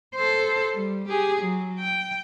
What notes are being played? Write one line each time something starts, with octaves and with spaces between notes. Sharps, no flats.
A4 C5
G3
G4 G#4
F#3
G5